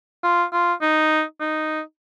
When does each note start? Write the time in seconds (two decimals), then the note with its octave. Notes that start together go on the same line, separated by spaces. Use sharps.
0.23 F4
0.53 F4
0.81 D#4
1.40 D#4